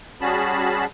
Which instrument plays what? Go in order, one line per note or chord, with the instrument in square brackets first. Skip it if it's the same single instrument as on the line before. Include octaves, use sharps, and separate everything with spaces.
[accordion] G3 C#4 F#4 G#4 A5 B5